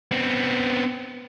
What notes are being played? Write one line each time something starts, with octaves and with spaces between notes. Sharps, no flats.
B3 C4